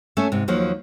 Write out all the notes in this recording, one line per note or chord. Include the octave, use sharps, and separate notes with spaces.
A3 C#4 A4 E5
G#2 C3
D#2 F3 F#3 A#3